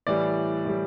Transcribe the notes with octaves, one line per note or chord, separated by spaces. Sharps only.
A2 E3 G3 D5
A2 E3 G3